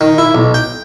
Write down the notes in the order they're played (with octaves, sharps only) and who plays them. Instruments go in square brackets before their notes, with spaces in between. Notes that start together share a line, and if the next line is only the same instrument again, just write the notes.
[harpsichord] D#3
E4
B1
G5